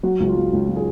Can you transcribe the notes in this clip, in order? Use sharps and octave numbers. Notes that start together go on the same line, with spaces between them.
F#3 F#4
C#2
F4
F#3
C#2
F#3
G#4